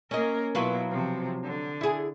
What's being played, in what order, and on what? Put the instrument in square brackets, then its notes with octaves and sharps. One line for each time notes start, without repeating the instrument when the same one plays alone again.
[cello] A#3 A#4 [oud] C#4 D#5
[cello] B2 E4 [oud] F#3 F4 B4
[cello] C3 F3
D3
[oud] E4 G#4